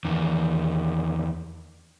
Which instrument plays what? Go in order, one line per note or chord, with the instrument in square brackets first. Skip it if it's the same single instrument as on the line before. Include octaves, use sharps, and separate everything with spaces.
[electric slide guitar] E2 D#3